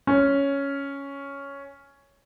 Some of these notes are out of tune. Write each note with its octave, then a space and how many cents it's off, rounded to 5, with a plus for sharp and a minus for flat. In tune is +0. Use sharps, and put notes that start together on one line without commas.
C#4 +5